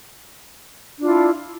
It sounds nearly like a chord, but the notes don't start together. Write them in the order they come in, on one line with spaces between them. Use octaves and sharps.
D4 F4 E4